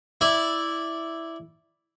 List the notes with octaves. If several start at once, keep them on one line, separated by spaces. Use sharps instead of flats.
E4 D5